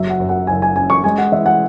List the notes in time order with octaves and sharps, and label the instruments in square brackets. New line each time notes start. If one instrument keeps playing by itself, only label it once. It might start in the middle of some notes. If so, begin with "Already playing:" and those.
Already playing: [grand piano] F#1 F#3 [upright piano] E5
[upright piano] F#5
[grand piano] F#2
[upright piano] F#5
[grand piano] F#1 [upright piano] G#5
[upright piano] G#5
[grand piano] C#4 [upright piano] G#5
[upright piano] C#6
[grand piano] G#3 [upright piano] G#5
[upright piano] F#5
[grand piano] E3 [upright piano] E5
[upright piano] F#5